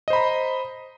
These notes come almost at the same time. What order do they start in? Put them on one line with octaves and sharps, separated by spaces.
D#5 C5 B5 A#5